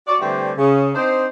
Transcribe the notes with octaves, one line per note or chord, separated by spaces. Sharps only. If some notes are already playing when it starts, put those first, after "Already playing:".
F#4 D5
D3 E3 G3 A3 C4 D4
C#3
C4 D4 D#4 C5